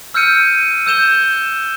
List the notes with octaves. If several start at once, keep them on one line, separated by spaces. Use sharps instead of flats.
E6 F6 G6 C#7 D#7
E6 G6 E7 G7